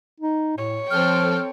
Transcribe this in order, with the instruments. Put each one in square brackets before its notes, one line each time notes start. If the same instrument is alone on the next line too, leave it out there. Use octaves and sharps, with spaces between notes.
[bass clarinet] D#4
[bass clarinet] A2 [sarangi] C#5
[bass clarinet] F3 [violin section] C4 A4 G5 [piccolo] F6